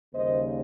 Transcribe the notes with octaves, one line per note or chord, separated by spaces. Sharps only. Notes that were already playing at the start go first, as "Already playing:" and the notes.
D#2 C#3 G3 A#3 C5 D#5